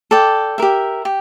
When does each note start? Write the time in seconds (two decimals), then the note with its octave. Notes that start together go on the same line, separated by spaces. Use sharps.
0.11 A4 D5 G5
0.58 G4 A#4 E5
1.05 G4